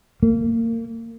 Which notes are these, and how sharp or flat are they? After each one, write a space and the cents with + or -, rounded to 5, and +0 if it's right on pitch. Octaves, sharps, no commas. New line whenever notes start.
A#3 -30